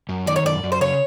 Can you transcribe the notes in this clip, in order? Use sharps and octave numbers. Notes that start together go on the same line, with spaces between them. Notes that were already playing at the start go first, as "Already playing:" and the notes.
F#2
D#3 D5
C#5
F#2 D5
F#2
C5
C#3 C#5